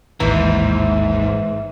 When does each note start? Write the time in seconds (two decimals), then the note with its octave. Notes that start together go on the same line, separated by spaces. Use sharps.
0.20 A1 D#2 G#2 E3 A#5